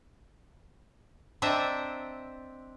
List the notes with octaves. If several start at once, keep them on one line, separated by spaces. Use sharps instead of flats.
C4 D4 D#5 E5 A#5